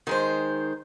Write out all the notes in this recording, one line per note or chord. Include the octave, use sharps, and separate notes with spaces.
D#3 G#3 C5